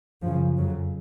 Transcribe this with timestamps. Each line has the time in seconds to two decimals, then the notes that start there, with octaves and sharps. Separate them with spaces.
0.22 F#2 C#3 F3
0.57 F2 C#3 F#3